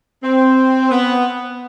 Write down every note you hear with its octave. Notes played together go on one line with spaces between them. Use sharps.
C4
B3